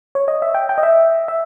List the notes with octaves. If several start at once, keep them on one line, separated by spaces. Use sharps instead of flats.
C#5
D#5
E5
G5
G5
D#5
E5
E5